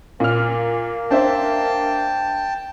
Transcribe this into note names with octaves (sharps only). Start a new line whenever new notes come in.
A#2 A#3 F6
D4 C5 E5 G5 A5